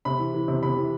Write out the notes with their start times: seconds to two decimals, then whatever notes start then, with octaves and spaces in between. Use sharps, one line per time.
0.05 C3 B5
0.19 E3
0.34 E3
0.48 C3
0.63 C3 B5
0.77 E3